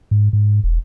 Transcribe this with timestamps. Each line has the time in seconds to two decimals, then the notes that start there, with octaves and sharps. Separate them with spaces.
0.11 G#2
0.33 G#2
0.64 E1